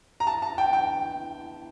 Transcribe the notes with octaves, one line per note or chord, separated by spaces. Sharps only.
A#5
A5
A5
G5
G5